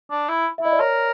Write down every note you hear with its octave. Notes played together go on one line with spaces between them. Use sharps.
D4
E4
E5
E4 D#5
D5
A#4 C#5